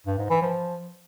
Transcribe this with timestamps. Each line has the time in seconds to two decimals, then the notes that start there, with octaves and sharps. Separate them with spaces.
0.07 G2
0.18 G#2
0.30 E3
0.42 F3